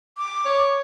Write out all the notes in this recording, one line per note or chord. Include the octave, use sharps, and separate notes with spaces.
D6
C#5